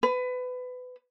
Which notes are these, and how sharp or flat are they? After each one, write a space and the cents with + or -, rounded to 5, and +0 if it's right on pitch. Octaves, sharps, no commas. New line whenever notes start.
B4 +25